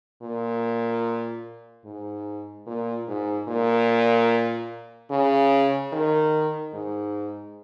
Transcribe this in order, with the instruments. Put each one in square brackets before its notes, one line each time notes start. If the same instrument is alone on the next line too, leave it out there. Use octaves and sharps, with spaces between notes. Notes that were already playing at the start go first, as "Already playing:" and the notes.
[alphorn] A#2
G#2
A#2
G#2
A#2
C#3
D#3
G#2